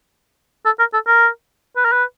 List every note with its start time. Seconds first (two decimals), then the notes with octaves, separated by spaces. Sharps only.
0.65 A4
0.79 A#4
0.93 A4
1.07 A#4
1.76 B4
1.85 A#4
1.92 B4